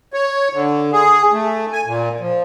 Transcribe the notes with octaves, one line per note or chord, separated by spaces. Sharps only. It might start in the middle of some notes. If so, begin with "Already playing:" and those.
C#5
D3
G#4
A3
G#5
A#2
F3